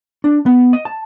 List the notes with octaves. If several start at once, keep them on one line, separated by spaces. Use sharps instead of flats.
D4
B3
D#5
A5